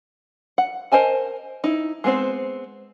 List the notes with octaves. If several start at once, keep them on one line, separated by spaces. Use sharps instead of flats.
F#5
A#4 C5 D#5 G#5 A5
D#4 E4
G#3 B3 C4 C5